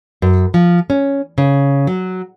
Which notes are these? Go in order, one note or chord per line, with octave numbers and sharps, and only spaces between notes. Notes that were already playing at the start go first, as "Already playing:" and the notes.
F#2
F3
C#4
C#3
F#3